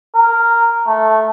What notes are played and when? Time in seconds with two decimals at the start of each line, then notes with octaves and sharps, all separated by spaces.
0.15 A#4
0.87 A3